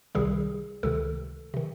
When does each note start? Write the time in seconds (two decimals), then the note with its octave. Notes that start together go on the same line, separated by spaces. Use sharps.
0.15 C2 C3 D#3 G3 G#4
0.83 C#2 C3 D#3 A4
1.54 C3 D#3